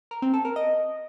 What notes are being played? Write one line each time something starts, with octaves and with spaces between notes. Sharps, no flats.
A#4
C4
A4
A#4
D#5